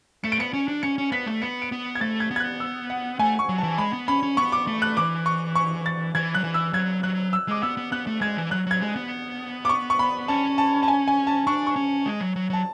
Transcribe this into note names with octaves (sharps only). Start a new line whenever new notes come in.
A3 C#7
D7
B3 C#7
C#4
D4
C#4 C#7
C#4
B3 B6
A3
B3 C#7
D7
B3
G#6
A3 A6
G#6
B3
G#6
F#6
E6
F#5
A3 G#5
C#6
F#3
A5
E3
G#3 B5
B3
C#4 B5
C#4
B3 C#6
D6
A3
F#6
E3 D6
C#6
C#6
A6
E3 G#6
F#3 F#6
E3
E6
F#3 G#6
F#3 F#6
E6
G#3 D6
B3 E6
B3
B3 F#6
A3
G#3 G#6
E3
F#3 F#6
F#3 G#6
G#3
B3
D6
C#6
C#6
B5
C#4 A5
A5
A5
G#5
G#5
A5
D4 C#6
C#6
C#4
G#3
F#3
F#3
F#3 A5